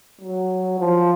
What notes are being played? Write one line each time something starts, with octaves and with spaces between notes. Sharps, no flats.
F#3
F3